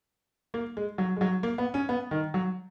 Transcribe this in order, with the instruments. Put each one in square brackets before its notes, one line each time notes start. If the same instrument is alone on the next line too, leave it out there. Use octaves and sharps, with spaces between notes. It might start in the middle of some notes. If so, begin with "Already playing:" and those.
[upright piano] A#3
G#3
F#3
G#3
F#3
A#3
B3
C#4
B3
D#3
F#3